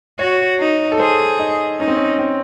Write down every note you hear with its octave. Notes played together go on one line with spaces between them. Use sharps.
F#4 C#5
D#4
A4
G#4 C5
D#4
C#4 D#4
C4
C#4
C4